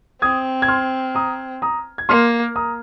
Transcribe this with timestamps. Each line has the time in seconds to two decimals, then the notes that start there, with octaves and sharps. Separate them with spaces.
0.22 C4 D#6 G#6
0.62 G#6
0.68 C6 F6
1.15 A#5 D#6
1.62 A#5 D#6
1.98 G#6
2.09 A#3 C6 F6
2.56 A#5 D#6